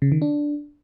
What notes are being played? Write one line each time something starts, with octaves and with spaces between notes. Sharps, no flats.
C#3
D#3
D4